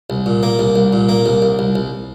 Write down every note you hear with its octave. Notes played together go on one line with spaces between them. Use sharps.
C2
A#2
A#3
C2
C2
A#2
A#3
C2
C2
C2
C2